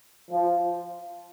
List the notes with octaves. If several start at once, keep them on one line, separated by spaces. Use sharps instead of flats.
F3